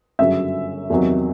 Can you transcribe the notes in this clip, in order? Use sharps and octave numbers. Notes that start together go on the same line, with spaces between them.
G1 F#2 C#3 F#3 E5
E2 C3 D#3 F#3